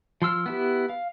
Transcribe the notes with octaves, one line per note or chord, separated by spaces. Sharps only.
F3 C6 E6 F6
B3 E4 G4
F5